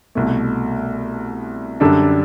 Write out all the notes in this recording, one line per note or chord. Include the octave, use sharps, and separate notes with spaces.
C2 B2 A3
F#2 D3 G3 D4 A4